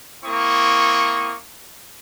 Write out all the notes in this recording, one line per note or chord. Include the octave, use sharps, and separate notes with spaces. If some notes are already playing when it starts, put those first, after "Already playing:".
A#3 C4 E4 C#6 D#6